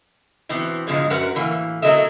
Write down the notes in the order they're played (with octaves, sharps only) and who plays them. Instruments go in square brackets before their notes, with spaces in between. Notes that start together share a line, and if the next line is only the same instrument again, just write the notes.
[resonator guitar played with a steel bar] B2 E3 B3 C4
G#2 B2 D3 F3 G#3
F#2 F#4 A#4 B4 F#5
A2 E3 A#3
B2 F#3 A3 A#4 D#5 E5